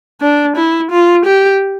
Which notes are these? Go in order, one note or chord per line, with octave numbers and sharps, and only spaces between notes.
D4
E4
F4
G4